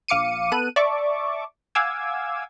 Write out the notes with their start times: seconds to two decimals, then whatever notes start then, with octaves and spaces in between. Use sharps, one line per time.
0.08 A#1 F5 D6 C#7 D#7
0.52 B3 A4 F#6 D#7
0.76 D5 E5 A5 C#6 D6
1.75 F5 F#5 G#5 D6 E6 G#6